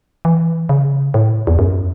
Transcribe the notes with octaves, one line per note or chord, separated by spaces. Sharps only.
E3
C#3
A2
E2
F#2